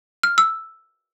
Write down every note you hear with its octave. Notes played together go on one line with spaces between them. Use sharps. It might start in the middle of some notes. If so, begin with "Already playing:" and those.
F6
E6